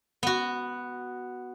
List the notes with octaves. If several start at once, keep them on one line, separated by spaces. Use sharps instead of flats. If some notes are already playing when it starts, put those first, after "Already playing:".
B3 F#4